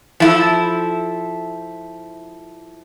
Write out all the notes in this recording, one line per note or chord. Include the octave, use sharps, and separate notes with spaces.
F3 E4 A4